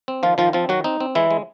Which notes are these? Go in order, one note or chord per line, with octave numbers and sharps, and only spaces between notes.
C4
D#3 F3 F4
D#3 F3 F4
F3 C4 F4
D#3 F#3 F#4
C4 D#4
C4
E3 G#3 E4
G#3